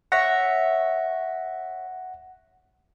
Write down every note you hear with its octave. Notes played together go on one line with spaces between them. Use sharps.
C#5 E5 F#5 A#6